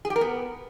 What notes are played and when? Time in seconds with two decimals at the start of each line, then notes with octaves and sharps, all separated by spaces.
0.05 G#4
0.10 G4
0.16 A#4
0.21 B3